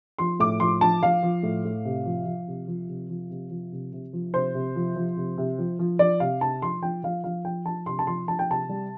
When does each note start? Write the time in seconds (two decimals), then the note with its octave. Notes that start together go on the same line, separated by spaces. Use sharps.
0.18 F3 C6
0.39 A2 D6
0.60 F3 C6
0.81 F3 A5
1.02 F3 F5
1.23 F3
1.43 A2
1.65 A2
1.85 C3
2.05 F3
2.26 F3
2.47 C3
2.68 F3
2.88 C3
3.10 F3
3.30 C3
3.51 F3
3.72 C3
3.93 C3
4.13 F3
4.33 C3 C5
4.54 C3
4.76 F3
4.96 F3
5.17 C3
5.38 C3
5.58 F3
5.79 F3
5.99 F3 D5
6.20 C3 F5
6.41 C3 A5
6.62 F3 C6
6.83 F3 G5
7.03 F3 F5
7.24 F3 F5
7.44 F3 G5
7.65 F3 A5
7.86 C3 C6
7.99 A5
8.07 F3 C6
8.27 F3 A5
8.39 G5
8.49 C3 A5
8.69 G3